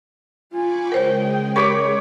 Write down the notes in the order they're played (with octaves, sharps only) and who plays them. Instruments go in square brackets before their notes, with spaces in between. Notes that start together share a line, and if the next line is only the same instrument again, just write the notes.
[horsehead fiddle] F4 G#5 [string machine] B5 C#6 D6
[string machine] C#3 G#3 G#4 [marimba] A#4 C5 C#5 [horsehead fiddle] G5
[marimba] G4 A#4 [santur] C#5 B5 D6